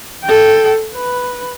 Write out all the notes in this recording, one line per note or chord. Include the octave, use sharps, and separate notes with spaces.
A4 G5
B4